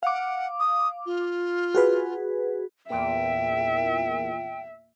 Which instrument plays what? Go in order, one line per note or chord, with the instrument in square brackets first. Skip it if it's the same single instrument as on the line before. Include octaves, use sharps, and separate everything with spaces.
[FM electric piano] F5 D6 [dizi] F#5
[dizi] D#6
F4
[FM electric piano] F#4 G#4 B4
[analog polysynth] E2 A#2 [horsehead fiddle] E5 [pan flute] G5